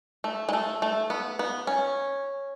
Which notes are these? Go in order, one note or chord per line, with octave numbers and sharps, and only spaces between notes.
A3
G#3
A3
A3
B3
B3
C#4